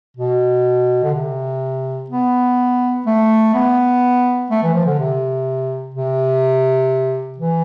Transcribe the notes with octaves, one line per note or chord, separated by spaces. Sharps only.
B2
D3
C3
B3
A3
B3
A3
E3
F3
D3
C3
C3
E3